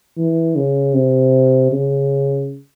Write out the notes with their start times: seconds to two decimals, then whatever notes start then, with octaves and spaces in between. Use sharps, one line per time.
0.17 E3
0.56 C#3
0.94 C3
1.72 C#3